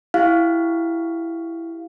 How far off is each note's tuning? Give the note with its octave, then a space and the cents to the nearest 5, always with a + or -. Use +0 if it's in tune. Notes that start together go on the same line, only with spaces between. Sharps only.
E4 +10 G4 +0 F5 +0